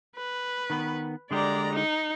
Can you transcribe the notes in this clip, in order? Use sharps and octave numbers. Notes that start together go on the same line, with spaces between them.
B4
D#3 B3
D3 G#3 G4 D5 A#5
D#4